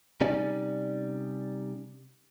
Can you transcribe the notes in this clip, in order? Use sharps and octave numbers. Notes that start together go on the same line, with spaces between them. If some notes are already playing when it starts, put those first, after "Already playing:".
C3 G3 C#4 D#4 D5 G#5